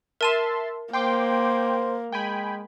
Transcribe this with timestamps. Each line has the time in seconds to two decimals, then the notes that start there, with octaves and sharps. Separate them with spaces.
0.21 A#4 E5 A5 C6 D#7 E7
0.93 A#3 C5 G5 C6 D6
2.12 G#3 G5 G#5 B5